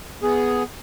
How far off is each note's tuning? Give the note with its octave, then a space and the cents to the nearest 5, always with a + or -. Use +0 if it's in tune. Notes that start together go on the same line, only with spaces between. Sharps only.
B3 +0 G#4 +0